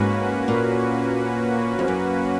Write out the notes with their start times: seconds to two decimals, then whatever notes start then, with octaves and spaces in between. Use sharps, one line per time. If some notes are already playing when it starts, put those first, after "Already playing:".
Already playing: G#2 A#3 C#4 F#4 B4
0.48 A#2
1.79 F2
1.88 F#2